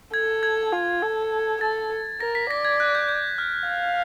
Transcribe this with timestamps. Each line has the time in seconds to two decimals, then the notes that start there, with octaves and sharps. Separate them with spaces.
0.14 A4 G#6
0.43 G#6
0.73 F4
1.02 A4
1.61 A4 A6
2.20 A#4 A#6
2.35 B6
2.49 D5 A#6
2.65 G#6
2.80 F#6
2.95 G6
3.09 G6
3.38 F6
3.69 F5